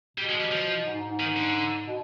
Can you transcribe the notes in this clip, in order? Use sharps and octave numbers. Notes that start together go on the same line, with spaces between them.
B2 G3
G#3
G3
F3
G#2
G#2
D#3
D3
B2